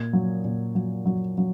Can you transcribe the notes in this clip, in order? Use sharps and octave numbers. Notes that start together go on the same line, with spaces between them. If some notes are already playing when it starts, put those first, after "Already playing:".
Already playing: A#2 G#6
F#3
A#2
F#3
F#3
F#3